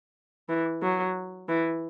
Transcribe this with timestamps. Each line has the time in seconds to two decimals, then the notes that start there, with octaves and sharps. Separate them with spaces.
0.49 E3
0.82 F#3
1.49 E3